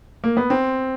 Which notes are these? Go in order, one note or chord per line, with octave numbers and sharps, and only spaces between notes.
A#3
B3
C4